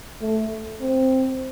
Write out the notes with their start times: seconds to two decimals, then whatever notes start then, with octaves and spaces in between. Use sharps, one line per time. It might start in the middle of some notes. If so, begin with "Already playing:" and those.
0.21 A3
0.81 C4